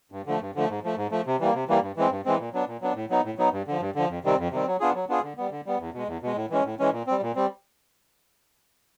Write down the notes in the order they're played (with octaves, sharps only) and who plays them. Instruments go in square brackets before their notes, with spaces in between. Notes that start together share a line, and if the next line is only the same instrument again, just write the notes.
[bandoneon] G2
D3 F3 A3
G2
D3 F3 A3
G#2
F3 A3
G#2
F3 A3
C3
E3 G3 A#3
C3
E3 G3 A#3
G2
E3 G#3 C4
G2
E3 G#3 C4
A#2
F#3 B3 D4
A#2
F#3 B3 D4
A2
F#3 B3 D#4
A2
F#3 B3 D#4
G2
D3 F3
G2
D3 F3
F2
C3 D#3 G3 C4
F2
C3 D#3 G3 C4
F#3
B3 D4 F4 G#4
F#3
B3 D4 F4 G#4
D3
G3 B3
D3
G3 B3
E2
B2 G#3
E2
B2 G#3
A2
E3 G#3 C#4
A2
E3 G#3 C#4
A#2
G3 C4
A#2
G3 C4